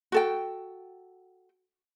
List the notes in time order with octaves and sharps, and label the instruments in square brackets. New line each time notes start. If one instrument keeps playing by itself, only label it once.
[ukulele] F#4 A4 G5